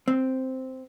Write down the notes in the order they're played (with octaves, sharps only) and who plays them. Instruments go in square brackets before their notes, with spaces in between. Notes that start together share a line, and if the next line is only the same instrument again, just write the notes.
[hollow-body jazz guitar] C4